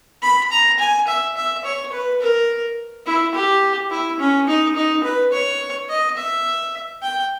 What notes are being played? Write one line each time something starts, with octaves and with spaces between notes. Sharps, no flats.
B5
A#5
G#5
E5
E5
C#5
B4
A#4
E4
G4
E4
C#4
D#4
D#4
B4
C#5
D#5
E5
G5